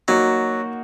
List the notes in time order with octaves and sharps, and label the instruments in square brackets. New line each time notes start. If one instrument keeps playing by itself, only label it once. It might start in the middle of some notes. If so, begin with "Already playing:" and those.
[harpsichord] F#3 [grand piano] A#3 D#4 F#4